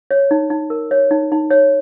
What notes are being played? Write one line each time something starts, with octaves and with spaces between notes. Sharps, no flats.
C#5
D#4
D#4
A#4
C#5
D#4
D#4
C#5